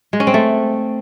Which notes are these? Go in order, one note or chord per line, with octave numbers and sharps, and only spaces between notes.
G#3
C#4
C4
A3